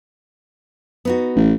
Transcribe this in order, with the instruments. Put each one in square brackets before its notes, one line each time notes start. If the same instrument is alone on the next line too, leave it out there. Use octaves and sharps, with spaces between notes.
[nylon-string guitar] B3 D#4 F#4
[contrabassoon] A1